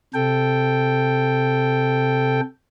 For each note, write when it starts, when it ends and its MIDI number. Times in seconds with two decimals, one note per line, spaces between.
0.14 2.41 48
0.14 2.41 69
0.14 2.41 79